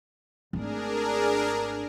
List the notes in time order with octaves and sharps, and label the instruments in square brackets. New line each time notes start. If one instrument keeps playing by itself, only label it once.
[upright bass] G#1 A3 [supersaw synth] D4 G#4 A#4